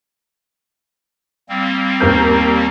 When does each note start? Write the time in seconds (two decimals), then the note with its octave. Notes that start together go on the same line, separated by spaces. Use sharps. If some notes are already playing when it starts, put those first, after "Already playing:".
1.49 G3 A#3 C4
2.00 D#2 A#4 G6